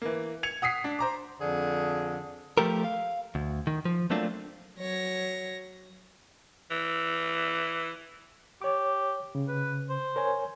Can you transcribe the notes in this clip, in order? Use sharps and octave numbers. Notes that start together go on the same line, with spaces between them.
E3 A#3
G#6 C#7 F7
F#5 D#6 B6 C7
D4
C5 A#5 D6
F2 D3 G#4
F3 A3 G4 A4 A#4
F5
D2
D#3
F3
F#3 A3 A#3 C4 D4 F4
F#3 C#5 A#6
E3
G4 C#5 D6
C#3
B4
C5
A#4 C#5 G#5